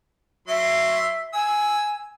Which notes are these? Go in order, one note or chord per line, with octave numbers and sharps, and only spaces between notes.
F#3 E5 C6
G#5 E6